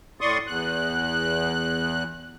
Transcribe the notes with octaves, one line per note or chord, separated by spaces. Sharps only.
A2 D5 C6 C#6 D#6
E2 F#6